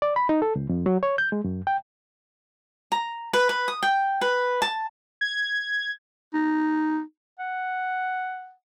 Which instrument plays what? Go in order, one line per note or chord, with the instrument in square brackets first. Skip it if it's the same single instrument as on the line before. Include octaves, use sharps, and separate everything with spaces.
[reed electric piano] D5
B5
D#4
A4
C#2
F2
F#3
C#5
G6
G#3
F#2
G5
[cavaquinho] A#5
B4
B4
D#6
G5
B4
A5
[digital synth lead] G#6
[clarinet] D#4
F#5